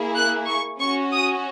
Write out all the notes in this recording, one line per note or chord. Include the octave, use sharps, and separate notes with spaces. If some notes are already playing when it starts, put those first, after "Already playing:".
Already playing: A#3 E4 G#4
F#6
C#6
C#4 F#4 C#6
D#6